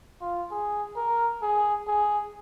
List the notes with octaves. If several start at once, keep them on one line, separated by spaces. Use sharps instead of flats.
F4
G#4
A#4
G#4
G#4